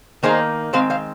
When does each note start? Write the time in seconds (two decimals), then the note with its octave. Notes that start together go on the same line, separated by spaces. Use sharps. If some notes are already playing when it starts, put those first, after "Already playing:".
0.23 D#3 A#3 D#4 G#4 C5
0.73 D#3 G#3 C4 C5 F5
0.90 C5 F5